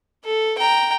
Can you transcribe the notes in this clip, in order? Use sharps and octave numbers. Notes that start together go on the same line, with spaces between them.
A4
G5 A#5